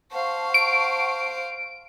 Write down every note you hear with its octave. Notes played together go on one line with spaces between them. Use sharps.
C5 F5 F#5 A5 C#6
D7